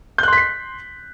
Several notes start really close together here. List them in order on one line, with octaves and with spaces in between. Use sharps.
G6 F#6 C6 B6 C7